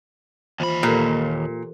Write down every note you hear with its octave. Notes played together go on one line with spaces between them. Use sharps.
D#2 E3 F4 C5 B5
A#2 G4 A4 A#4